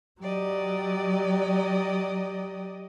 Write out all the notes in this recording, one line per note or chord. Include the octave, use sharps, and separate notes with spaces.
F#3 G4 D5 D#5